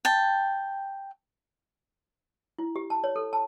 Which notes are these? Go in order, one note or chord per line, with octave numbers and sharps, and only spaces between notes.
G5 A5
E4
G4
A5
C#5
A4
A5